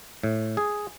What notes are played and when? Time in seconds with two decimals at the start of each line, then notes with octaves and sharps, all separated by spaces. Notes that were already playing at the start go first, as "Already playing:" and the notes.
0.23 A2
0.57 G#4